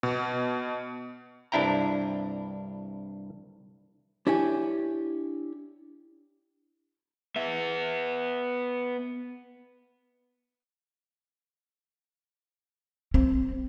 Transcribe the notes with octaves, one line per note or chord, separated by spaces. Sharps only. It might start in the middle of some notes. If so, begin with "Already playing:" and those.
B2
C2 G2 D4 E4 G5 A#5
D4 E4 G4 C#5 G#5
B3 E5
C4